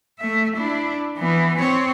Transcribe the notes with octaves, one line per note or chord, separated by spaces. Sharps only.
A3 E5
D4 E4
E3 B3
C4 C#5